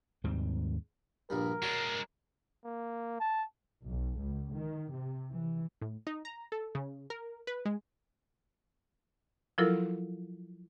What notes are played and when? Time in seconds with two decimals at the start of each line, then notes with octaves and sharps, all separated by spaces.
0.24 D#2 G#2 G3 C4
1.30 A#1 G2 G3 A#4
1.62 G#3 D4 F#4 C#5
2.64 A#3
3.20 A5
3.86 B1
4.18 C#2
4.55 D#3
4.91 C3
5.32 E3
5.81 A2
6.07 D#4
6.25 A#5
6.52 A4
6.75 C#3
7.10 A#4
7.47 B4
7.65 G#3
9.58 F3 F#3 E4 F4 A4 A#4